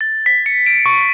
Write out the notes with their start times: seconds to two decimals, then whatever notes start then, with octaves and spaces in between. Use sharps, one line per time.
0.01 A6
0.26 B6
0.46 C#7
0.66 D7
0.86 C#6